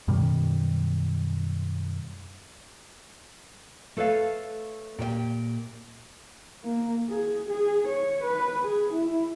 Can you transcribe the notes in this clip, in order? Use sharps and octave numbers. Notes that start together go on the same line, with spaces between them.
F#2 B2 D#3 G3
A3 A4 B4 C#5 F5
A#2 G4 C#5 G5
A#3
G#4
G#4
C#5
B4
G#4
E4